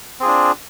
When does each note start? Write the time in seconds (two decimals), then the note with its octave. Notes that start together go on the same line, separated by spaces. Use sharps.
0.20 C4
0.22 G#4
0.25 F4
0.27 D4